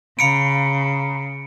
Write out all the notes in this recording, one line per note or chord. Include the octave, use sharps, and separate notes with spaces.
C#3 F5 A#5 B5 C#7 D7